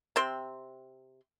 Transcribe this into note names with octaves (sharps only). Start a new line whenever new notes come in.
C3 C4 C6